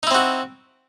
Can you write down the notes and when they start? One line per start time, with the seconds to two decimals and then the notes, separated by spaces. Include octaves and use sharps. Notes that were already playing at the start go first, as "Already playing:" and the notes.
0.03 D#4
0.07 E4
0.11 C4
0.15 F#4